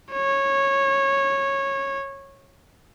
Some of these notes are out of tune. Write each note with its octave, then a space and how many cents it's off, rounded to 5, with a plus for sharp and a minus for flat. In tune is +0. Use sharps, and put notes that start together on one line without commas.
C#5 -15